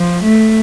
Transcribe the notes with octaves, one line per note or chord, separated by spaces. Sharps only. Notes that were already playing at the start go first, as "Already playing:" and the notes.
Already playing: F3
A3